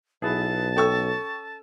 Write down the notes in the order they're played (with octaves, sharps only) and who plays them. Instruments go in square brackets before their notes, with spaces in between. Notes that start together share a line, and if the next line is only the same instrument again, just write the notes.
[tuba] B1 [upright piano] B3 E4 G#4 [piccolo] A5
[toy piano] C#4 A4 C#5 [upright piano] G5 C#6 E6